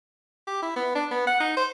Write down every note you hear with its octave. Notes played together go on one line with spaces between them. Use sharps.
G4
E4
B3
D4
B3
F#5
D#4
C5